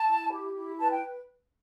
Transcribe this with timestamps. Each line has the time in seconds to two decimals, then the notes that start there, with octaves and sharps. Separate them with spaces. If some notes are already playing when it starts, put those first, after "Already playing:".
Already playing: A5
0.09 E4
0.33 G4
0.57 E4
0.80 B4 A5
0.91 G5